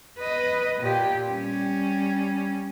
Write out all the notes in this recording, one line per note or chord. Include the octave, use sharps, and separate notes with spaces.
B4 D#5
A#2 G4
G3 C#4